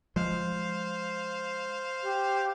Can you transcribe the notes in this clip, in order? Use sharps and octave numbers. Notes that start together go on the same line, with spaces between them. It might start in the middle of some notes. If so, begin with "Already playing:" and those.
F3 G#3 C5 F5
G4